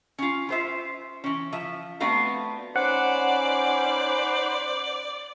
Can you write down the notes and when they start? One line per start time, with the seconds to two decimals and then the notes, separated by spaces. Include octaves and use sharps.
0.18 C#4 F4
0.49 F4 C5 E5
1.24 E3 C#4
1.52 F3 E5
2.00 A3 B3 C4 D4 F#4 F5
2.76 C#4 D#4 B4 C5 D5 F#5